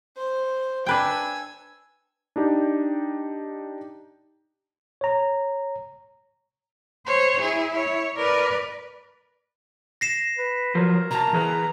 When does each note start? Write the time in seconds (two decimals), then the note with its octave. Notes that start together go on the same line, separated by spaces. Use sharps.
0.17 C5
0.86 D4 B4 G5 G#5 E6
2.36 D4 D#4 G4
5.01 C#5 A#5
7.06 C5 C#5
7.41 E4 G#4
7.74 C#5
8.17 A#4 B4 D5
10.01 A#6 C7 E7
10.38 B4
10.75 F3 F#3 A#4
11.11 B2 A5 A#5
11.33 E3 G#4 B4